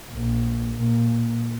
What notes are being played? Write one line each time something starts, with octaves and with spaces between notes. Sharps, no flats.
A#1
A#2